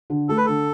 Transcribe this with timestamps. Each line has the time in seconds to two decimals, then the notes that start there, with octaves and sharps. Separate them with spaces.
0.10 D3
0.29 A3 A4
0.37 B4
0.46 D3 A4